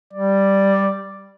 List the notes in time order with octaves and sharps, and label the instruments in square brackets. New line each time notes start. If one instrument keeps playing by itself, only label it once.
[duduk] G3 [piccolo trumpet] D5